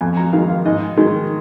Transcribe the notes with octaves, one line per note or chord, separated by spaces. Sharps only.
F2 G#5
A#5
D#3 G#3 F5
F5
G#2 D#5
D#3 G#3